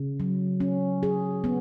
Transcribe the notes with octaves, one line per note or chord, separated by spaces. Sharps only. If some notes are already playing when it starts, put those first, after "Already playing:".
Already playing: C#3
F#3
C#4
G#4
B3